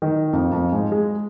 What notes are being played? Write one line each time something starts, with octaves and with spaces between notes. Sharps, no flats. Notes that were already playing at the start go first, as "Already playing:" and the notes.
D#3
F2
F2
G#2
G#3